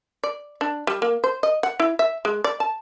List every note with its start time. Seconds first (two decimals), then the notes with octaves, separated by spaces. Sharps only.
0.23 D5
0.61 D4
0.87 G3
1.02 A#3
1.24 C5
1.43 D#5
1.63 F#5
1.80 E4
1.99 E5
2.25 G#3
2.44 D5
2.60 A5